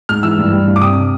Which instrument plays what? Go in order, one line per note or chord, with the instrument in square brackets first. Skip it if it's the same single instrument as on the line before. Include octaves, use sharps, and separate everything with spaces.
[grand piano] G#2 F6
E3 E6
G2
G3
G2
D6
C3 D#6